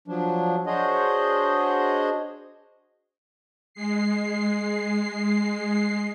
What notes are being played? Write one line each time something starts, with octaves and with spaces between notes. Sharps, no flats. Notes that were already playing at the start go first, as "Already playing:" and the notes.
F3 F#3 D4
D4 F#4 G#4 C5 C#5 D#5
G#3 C7